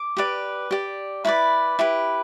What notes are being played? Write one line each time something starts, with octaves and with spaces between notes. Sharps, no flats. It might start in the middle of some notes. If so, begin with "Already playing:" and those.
Already playing: D6
G4 B4 D5
G4 D5
E4 B4 D5 B5
E4 G4 B4